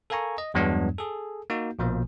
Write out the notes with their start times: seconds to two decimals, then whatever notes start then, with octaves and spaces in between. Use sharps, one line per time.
0.10 A4 A#4 F5 G#5 A#5 C#6
0.38 D#5
0.54 E2 G2 F#3 G#3 B3 D4
0.98 G#4 A4
1.50 A#3 D#4 F#4
1.79 A#1 B2 F3 A#3